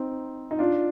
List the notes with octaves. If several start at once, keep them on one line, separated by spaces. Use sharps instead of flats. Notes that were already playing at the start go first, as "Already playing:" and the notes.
Already playing: C4 D#4
D#4
D4 F4